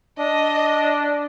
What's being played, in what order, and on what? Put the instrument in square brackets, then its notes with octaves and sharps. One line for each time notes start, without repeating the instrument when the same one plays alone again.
[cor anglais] D4 [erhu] D#5